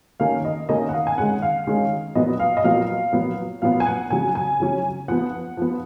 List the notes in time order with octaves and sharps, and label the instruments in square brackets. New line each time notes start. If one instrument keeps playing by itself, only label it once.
[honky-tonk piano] D#3 A#3 C#4 F5
D#5
D#3 A#3 C#4 D#5
F#5
F5
G#5
D#3 G#3 C#4 F#5
F5
D#3 G#3 C#4
A#2 F#3 B3 D#5
F5
D#5
A#2 F#3 B3 F5
A#2 F#3 B3
A#2 F#3 B3 F5
G#5
F#5
C#3 F#3 C#4 G#5
G#5
C#3 F#3 C#4
F3 B3 F#5
F3 B3